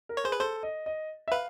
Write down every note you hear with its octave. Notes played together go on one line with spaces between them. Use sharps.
A#4
C#5
G#4 C5
B4
A4 C5
D#5
D#5
E5
B4 F5